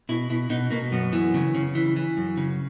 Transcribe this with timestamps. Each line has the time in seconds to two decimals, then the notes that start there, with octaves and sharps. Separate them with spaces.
0.09 B2 E4
0.30 B2 E4
0.50 B2 D#4
0.71 B2 A#3
0.92 F#2 B3
1.13 E3
1.34 C#3
1.55 C#3
1.75 E3
1.96 E3
2.17 F#2
2.37 C#3